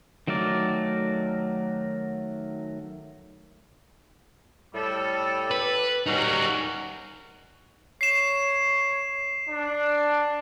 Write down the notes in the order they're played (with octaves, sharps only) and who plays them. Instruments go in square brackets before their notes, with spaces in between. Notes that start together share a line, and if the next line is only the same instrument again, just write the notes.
[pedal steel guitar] D#3 F#3 A3 A#4 D5
[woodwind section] A2 G3 A4
[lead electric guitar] B4
[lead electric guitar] G3 D#4 [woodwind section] C#4 F#4 A#4
[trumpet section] C#5 [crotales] C7 E7
[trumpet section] D4